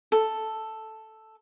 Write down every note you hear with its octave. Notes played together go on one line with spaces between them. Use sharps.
A4